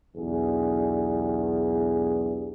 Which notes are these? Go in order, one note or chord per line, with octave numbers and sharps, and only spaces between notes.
B1 E2 D4 G4 G#4